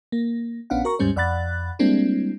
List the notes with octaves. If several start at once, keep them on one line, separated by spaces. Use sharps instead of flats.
A#3
A#1 B3 C#4 D4 F5 F#5
F#4 A#4 A#5 C#6
D#2 G#2 G3 C#4 C5
F2 D5 F#5 B5 F#6 A6
G3 G#3 A#3 C4 D4 E4